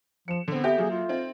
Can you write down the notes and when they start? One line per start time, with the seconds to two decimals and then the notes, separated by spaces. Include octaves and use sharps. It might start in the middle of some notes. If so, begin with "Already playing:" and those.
0.28 F3 C#7 E7
0.48 D3 B3 C4
0.64 G4 A4 E5 G#5 G6
0.78 F#3 A#3 G#4
0.91 F4
1.09 C4 D#4 D#5